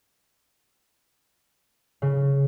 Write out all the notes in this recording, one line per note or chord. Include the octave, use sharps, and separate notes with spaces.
C#3